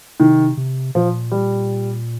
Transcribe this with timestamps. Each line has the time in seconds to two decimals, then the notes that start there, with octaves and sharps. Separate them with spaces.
0.20 C3 D#3
0.57 C3
0.95 A#2 F3
1.31 G3